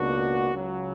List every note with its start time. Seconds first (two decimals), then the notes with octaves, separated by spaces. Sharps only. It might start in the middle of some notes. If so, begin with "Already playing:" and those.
Already playing: C#2 B2 A#3 D4 F#4
0.53 C#2 C#3 F#3